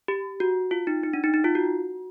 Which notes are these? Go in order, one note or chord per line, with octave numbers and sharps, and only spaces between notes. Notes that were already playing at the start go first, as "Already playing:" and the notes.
G4
F#4
F4
D#4
D#4
D4
D#4
D#4
F4
F#4